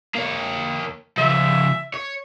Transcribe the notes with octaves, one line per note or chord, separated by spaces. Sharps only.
A#3 C#5
C#3 F3 E5
C#5